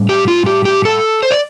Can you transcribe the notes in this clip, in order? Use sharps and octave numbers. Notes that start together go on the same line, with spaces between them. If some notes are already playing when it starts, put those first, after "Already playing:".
Already playing: A2 G3
G4
F4
G4
G4
A4
C5
D5